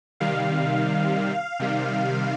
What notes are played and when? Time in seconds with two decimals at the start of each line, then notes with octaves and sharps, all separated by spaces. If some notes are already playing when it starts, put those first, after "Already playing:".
0.20 C3 D#3 G3 F5
1.60 C3 D#3 G3